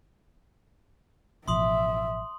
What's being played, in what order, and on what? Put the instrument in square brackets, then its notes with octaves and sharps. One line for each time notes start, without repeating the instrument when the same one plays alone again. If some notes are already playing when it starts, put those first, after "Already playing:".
[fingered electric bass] A1 B2 F3 [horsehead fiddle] E5 [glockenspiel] C6 D#6 F#7